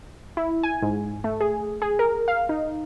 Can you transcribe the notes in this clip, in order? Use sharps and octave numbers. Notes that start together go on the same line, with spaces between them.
E4
G#5
G#2
A3
G#4
G#4
A#4
F5
D#4